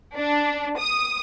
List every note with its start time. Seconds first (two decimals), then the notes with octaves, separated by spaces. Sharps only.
0.17 D4
0.78 D#6